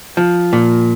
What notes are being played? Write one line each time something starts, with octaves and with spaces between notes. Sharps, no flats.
F3
A#2